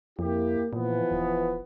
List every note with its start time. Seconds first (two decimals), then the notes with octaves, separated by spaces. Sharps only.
0.19 F2 A#3 E4 G4
0.73 A#2 E3 F3 B3
1.11 D#1